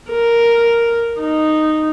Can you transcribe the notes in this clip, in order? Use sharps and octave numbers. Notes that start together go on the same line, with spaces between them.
A#4
D#4